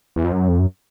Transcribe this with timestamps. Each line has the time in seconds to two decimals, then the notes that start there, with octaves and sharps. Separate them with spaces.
0.16 E2
0.24 F2
0.32 F#2
0.48 F2
0.59 F#2